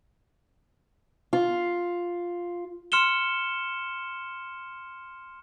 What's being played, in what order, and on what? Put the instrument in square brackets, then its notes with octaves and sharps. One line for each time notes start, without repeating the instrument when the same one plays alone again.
[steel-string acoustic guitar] F4
[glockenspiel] C6 F6 C#7 E7 G7